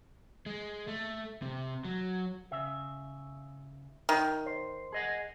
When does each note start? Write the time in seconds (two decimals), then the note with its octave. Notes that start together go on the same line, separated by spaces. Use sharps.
0.46 G#3
0.88 A3
1.42 C3
1.85 F#3
2.52 C#3 E5
4.09 D#3
4.46 C5
4.93 G#4 D#5 F#5